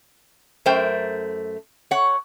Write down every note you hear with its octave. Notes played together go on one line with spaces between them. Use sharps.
F#2 A3 A#4 C5 G5
C#5 F#5